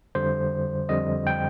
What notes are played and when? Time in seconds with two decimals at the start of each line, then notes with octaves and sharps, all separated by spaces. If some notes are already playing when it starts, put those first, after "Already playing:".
0.15 F2 D3 G3 C5
0.89 F2 D3 G3 D#5
1.27 G5